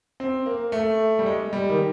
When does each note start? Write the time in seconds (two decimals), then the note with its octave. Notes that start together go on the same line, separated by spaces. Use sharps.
0.20 C4
0.46 A#3
0.72 A3
1.19 G3
1.26 G#3
1.53 G3
1.70 D#3